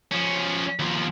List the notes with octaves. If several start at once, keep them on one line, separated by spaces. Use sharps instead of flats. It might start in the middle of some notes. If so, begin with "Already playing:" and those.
F3 C#4
D#2 F3